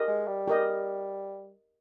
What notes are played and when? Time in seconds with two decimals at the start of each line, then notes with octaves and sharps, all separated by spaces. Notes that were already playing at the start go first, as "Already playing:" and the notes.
Already playing: G4 A#4 D#5
0.08 G#3
0.27 G3
0.48 G4 A#4 D#5